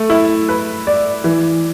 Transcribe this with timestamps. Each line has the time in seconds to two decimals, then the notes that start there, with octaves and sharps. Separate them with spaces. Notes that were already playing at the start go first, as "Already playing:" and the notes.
Already playing: A3
0.10 E4
0.49 B4
0.87 D5
1.24 E3